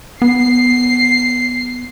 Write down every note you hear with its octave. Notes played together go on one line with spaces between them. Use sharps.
B3 C7